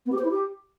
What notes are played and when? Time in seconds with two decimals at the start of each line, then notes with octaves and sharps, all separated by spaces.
0.06 B3
0.12 G4
0.18 C5
0.24 E4
0.31 G4